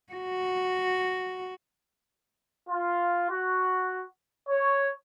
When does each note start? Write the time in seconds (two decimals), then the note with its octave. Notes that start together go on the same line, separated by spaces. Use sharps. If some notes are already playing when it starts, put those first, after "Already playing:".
0.13 F#4
2.69 F4
3.30 F#4
4.48 C#5